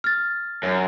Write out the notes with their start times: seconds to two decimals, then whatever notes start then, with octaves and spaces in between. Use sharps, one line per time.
0.04 F6 A6
0.63 F#2